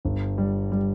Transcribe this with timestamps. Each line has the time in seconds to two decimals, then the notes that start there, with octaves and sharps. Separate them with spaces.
0.05 G1
0.38 G3
0.72 G3